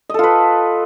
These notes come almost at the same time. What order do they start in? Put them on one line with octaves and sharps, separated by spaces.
D#5 A4 F4 B4